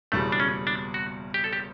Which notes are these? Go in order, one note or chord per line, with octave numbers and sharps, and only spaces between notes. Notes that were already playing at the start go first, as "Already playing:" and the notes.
F#1 E2 B2 G3 A3
D4
C#4
D4
F#4
G4
A4
G4